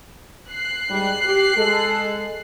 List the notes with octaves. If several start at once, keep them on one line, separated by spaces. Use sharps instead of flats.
F#6 C7
G#2 G3
G4
G#3 A4